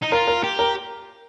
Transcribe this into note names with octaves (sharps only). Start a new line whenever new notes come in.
D#4
F4 A#4
A#4
G4
A#4